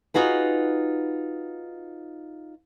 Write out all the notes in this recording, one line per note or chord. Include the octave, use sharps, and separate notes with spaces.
D#4 F4 F#4 G#4 B4